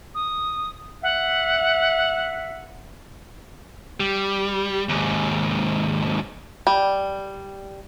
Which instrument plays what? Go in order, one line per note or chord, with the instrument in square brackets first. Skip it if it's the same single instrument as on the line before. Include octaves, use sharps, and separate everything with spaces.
[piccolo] D#6
[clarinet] E5 [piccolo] F#5
[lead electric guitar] G3
D#2 G#2
[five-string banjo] G3